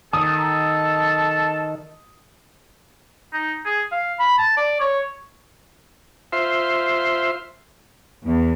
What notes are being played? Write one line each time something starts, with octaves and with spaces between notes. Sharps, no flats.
D#3 A4 A5 D#6
D#4
G#4
F5
B5
A5
D5
C#5
F4 C5 E5 C6
E2